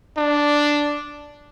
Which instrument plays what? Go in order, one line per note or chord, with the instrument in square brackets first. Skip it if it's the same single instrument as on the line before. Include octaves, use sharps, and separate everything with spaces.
[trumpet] D4